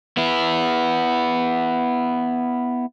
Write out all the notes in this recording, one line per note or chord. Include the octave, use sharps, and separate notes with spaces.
B3 E4